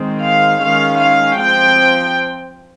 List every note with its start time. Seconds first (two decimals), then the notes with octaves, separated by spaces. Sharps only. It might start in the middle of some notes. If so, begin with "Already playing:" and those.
Already playing: D#3 G#3 C4
0.22 F5
0.62 D#3 G#3 C#4 F5
1.00 F5
1.38 F3 C4 G5